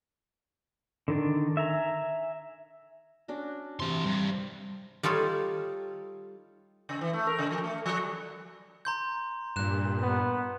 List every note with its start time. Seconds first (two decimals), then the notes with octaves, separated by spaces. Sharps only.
1.08 D3 D#3 D4
1.57 E5 G#5 A#5
3.28 C#4 D4 F#4
3.80 C3 E3 F5 C6
4.05 G2 C5
5.03 G3 D#4 F4 A4 C#5
6.89 C#3
7.01 E3
7.13 A3
7.27 A#4
7.39 C#3
7.51 F3
7.64 A3
7.86 F3
7.98 G3
8.85 A#5 C6 G6
9.56 G2 A#2 F#6 E7
10.03 B3